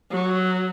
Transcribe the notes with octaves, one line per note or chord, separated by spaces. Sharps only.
F#3